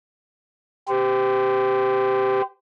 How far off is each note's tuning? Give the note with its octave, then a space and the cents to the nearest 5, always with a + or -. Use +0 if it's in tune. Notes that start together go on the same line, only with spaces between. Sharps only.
G4 +0 C5 -35